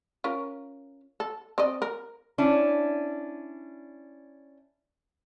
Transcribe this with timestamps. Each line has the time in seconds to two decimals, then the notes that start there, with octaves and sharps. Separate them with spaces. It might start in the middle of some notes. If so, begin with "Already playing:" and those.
0.24 C#4 F4 A#4
1.20 A4
1.58 C4 D5 D#5
1.82 A#4
2.38 C#4 D4 E4